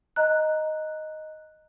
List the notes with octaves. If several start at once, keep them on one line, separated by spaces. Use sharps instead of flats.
D#5 A#5 F#6